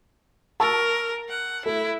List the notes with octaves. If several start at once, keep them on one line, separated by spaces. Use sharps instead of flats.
A#4 A5 C#6 E6
F#5
A3 E4